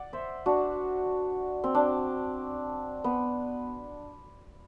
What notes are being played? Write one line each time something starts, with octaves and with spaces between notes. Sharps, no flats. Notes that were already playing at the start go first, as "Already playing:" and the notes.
Already playing: D5 F#5
C5 E5
D4 F#4
C4
D4
B3